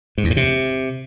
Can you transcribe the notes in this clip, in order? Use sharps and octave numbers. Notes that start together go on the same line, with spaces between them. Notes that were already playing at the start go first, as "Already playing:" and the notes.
G#2
E2
A2
C3